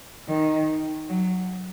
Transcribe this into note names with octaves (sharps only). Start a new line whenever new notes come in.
D#3
F#3